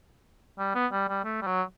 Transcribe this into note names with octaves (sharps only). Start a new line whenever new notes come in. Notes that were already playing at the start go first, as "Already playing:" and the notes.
G3
B3
G3
G3
A3
G3
F#3